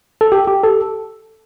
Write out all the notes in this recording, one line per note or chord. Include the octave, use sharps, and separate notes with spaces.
A4
G4
G4
A4